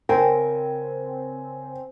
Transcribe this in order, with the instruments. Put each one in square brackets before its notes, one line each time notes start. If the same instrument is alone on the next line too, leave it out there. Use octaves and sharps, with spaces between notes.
[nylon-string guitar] C#3 A#4 [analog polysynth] C4 [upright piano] G#5